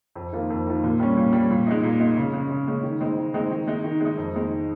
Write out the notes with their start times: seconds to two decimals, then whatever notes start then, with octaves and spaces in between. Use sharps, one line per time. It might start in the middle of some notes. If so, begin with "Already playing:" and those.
0.16 F2
0.33 D#3 A#3 F4
0.50 F2
0.66 D#3 A#3 F4
0.84 A#2
1.00 G3 C#4
1.17 A#2
1.33 G3 C#4
1.51 A#2
1.67 G#3 D#4
1.83 A#2
2.00 G#3 D#4
2.17 C#3
2.33 G#3
2.38 C#4
2.51 C#3
2.68 G#3 C#4
2.83 D#3
3.01 G#3 C4 D#4
3.17 D#3
3.34 G#3 C4 D#4
3.51 D#3
3.68 G#3 D#4
3.84 D#3
4.01 G#3 D#4
4.18 F2
4.35 D#3 G#3 D#4